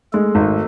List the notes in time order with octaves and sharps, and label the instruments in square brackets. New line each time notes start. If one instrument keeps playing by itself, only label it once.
[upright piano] G#3 [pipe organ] A3 A4
[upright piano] G#1